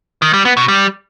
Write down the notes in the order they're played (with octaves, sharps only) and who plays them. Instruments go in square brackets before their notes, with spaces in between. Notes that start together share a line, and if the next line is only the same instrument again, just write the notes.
[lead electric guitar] D#3
G3
B3
B2
G3